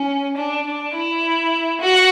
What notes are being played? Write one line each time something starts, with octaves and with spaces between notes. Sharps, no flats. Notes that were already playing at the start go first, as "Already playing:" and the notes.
Already playing: C#4
D4
D4
E4
F#4